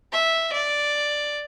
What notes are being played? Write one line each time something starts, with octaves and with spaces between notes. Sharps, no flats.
E5
D5